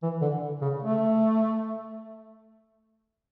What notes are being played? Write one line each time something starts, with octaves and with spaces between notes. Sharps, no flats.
E3
D3
C#3
A3